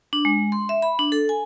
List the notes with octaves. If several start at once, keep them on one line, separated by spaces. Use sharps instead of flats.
D4
G#3
C6
E5
B5
D4
A4
G#5